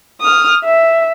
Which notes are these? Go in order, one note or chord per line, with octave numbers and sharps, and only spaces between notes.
D#6 F6
E5